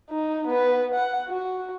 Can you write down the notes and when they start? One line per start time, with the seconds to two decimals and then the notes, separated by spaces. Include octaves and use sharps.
0.10 D#4
0.48 B3 B4
0.94 F#5
1.28 F#4